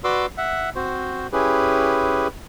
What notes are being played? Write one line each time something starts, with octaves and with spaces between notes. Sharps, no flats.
F#4 B4 D5 C6 D6 E6
E5 F#5
C4 F#4 C5
C#4 E4 G4 G#4 B4